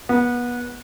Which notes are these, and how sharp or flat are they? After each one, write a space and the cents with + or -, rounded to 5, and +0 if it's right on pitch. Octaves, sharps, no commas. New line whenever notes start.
B3 -25